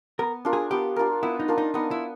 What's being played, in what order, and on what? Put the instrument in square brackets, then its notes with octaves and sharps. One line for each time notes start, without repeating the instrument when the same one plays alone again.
[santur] B3 [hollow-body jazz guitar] A#4
[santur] D4 F4 A#4
[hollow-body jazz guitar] G#4
[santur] B3 [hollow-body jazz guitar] G4
[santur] D4 F4 A#4
[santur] B3 [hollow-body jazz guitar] E4
[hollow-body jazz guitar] D#4
[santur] D4 F4 A#4
[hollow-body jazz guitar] D#4
[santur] B3 [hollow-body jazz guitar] D#4
[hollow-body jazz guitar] E4